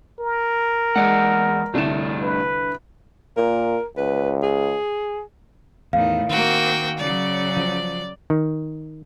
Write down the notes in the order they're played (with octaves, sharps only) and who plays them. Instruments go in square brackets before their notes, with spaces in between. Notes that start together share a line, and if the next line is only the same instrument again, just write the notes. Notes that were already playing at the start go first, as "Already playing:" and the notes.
[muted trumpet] A#4
[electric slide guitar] E2 D5 F#5 [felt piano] G#3
[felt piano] C2 D3 E7 [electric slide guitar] G2 A3 D4
[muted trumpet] B4
[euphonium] A#2 [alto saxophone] A#4
[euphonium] C#2 [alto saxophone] B4
[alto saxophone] G#4
[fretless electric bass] E2 [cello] A2 D#3 [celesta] F5
[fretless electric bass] D#3 [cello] A#3 C4 [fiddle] F#4 G5
[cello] C#3 F#3 [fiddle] D5
[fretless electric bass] F3
[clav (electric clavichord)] D#3